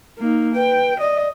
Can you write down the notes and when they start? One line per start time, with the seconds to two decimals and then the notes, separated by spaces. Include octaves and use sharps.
0.18 A#3 D#4
0.55 B4 G5
1.00 D5 D#5